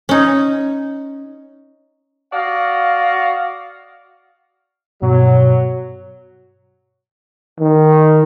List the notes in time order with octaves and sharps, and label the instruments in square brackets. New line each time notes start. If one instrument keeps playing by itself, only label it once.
[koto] C#4 D#4
[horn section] F#4 D5 D#5 F5
[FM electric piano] G2 B2 [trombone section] F#3
[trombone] D#3